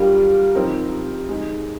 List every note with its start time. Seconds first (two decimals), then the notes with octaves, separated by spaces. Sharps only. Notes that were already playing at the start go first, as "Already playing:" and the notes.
Already playing: G3 D4 F4 A#4
0.55 F3 C4 D#4 A#4
1.29 G#3 D#4 G#4